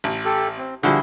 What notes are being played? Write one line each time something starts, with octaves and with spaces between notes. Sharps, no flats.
A1
G4 A4
C4
D3 F3 G3 E4 F#4 G#4